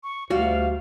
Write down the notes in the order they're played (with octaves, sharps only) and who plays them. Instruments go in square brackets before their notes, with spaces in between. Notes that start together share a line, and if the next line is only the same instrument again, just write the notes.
[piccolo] C#6
[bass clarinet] D2 [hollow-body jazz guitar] G3 F4 F#4 [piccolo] F5